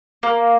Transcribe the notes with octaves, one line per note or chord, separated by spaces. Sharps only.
A#3